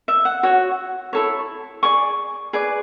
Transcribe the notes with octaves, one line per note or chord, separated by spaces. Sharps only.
E5
F#5
F#4 C#5
E4 A4 C#5
G#4 D5 C#6
G#4 B4 D5